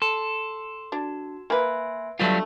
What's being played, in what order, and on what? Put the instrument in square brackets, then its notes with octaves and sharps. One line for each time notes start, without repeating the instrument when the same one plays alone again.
[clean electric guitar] A4 [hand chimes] C6
[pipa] D4 [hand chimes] F#4
[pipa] A#3 B4 [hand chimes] E5 G#5 C6
[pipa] B2 D3 A3 [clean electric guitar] F#3 G3 F4